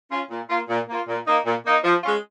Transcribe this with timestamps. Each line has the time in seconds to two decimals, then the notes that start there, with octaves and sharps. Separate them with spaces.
0.11 C#4 F4
0.30 A#2
0.50 A#3 F4
0.69 A#2
0.89 A#3 F4
1.08 A#2
1.27 A#3 D#4
1.46 A#2
1.65 A#3 D#4
1.84 F3
2.03 G#3 C#4 F4